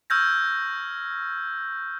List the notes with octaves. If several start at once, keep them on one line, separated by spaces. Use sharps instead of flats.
C#6 E6 F6 G6 G#6 A#6